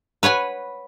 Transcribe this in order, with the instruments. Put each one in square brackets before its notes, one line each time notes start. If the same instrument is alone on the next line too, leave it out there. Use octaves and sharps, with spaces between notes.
[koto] B4 C#5 F#5 G#5